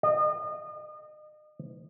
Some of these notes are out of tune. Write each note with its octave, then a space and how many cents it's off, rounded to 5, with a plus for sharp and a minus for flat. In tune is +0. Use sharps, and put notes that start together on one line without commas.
D#5 -35